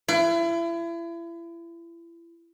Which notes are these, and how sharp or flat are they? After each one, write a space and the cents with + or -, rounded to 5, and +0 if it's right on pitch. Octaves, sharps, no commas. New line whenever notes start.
E4 +35